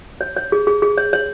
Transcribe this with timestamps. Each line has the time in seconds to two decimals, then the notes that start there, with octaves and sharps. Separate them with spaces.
0.21 C#5
0.37 C#5
0.52 G#4
0.67 G#4
0.82 G#4
0.97 C#5
1.13 C#5